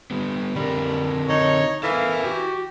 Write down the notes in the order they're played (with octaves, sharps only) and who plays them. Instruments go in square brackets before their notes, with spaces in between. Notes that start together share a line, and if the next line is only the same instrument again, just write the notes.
[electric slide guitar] G3 B3
[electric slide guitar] D3 C4 A#4 [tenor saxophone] G3
[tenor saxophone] D#4 [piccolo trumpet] C#5
[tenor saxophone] E3 [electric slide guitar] A4 A#4 E5 [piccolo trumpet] F5
[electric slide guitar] F#4 [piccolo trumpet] G4